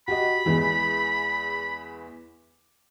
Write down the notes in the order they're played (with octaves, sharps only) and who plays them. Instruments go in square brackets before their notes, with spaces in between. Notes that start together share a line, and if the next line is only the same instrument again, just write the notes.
[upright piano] F#4 G4 D#5 [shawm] B5
[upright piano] E2 E3 G#3